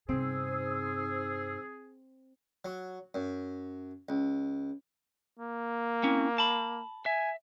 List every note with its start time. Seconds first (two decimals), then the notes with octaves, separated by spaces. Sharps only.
0.09 G2 C3 C4 D#4 G#4 C5 E6
2.65 F#3
3.14 F#2
4.09 C#2
5.39 A#3
6.03 C4 C#4 E4
6.38 A5 B5
7.06 E5 G#5